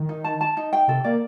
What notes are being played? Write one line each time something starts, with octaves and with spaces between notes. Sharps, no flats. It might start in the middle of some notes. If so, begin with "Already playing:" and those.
Already playing: D#3
D#4
A5
A5
D#4
G5
C3 A4
A#3 D5